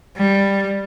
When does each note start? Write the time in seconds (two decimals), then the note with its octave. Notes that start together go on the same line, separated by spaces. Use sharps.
0.16 G3